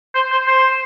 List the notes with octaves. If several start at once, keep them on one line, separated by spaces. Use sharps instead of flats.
C5
C5
C5